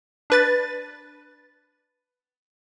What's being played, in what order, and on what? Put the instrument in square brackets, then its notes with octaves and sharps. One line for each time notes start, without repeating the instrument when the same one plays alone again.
[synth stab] D4 B4 A6